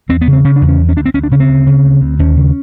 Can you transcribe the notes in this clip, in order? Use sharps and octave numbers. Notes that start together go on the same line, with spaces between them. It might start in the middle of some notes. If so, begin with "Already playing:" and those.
E2 C4
B3
C#3
C4
C#3 C#4
D4
E2
C#4
D2
C#4
D2 D4
C4
D2 C#4
D4
C#3 C#4
C4
D2
C#3
D2
D2
D#2 C#4
C#3